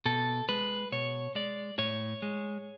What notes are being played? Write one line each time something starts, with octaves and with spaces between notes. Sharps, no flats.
B2 A4
G#3 B4
B2 C#5
G#3 D5
A2 C#5
G#3